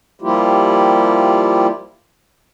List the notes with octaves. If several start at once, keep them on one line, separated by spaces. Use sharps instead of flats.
F3 G3 A#3 E4 F4 G4